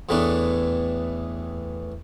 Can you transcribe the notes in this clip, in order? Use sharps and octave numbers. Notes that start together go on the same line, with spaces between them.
E2 A2 E3 A3 B3 D4